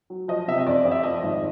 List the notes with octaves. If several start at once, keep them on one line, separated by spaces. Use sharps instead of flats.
F#3
F3 D#5
C3 E5
D#5
F2 D5
F2
E5
F3 D#5
G#1